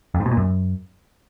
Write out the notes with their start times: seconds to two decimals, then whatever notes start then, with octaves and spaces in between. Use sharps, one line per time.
0.14 F2
0.20 G#2
0.26 B2
0.31 A#2
0.37 F#2